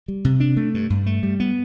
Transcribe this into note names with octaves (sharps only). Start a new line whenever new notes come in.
G3
C3
D4
A3
G2
G2
A3
G3
B3